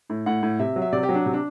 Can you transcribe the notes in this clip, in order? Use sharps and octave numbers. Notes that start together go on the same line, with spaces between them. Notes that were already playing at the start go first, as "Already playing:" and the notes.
A2
A2 F#5
A2
C3 E5
F#3
E5
C3 D5
G4
F#3
D4
C3
D4